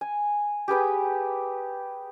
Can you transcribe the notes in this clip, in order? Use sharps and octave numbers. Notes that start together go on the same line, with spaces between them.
G#5
G4 G#4 B4 G5